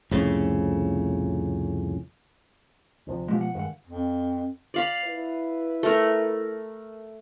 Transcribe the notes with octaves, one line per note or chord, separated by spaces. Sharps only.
C2 F2 A2 C#3
D2 C3 F3
B2 F3 G#3 A3 G4
F#5
G2 D#3 G#3 F#5
F2
D5 F5 B5
E4 B4
A3 A#4